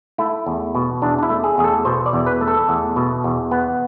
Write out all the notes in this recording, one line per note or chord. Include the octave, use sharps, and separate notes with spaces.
A3 E4
E2
B2
E2 D4
D4
E4
A3
G#4
E2 G#4
A4
B2 C5
D5
E2
B4
A3
A4
E2
B2
E2
B3